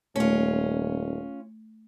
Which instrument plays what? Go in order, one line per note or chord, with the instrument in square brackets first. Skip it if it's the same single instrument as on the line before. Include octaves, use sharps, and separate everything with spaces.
[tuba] D#1 [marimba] A3 [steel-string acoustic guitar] C#4 F4